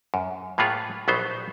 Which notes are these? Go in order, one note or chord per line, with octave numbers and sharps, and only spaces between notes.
F#2
A2 A#3 B3 F4 G#4 C#5
A#1 F#3 B3 D#4 C5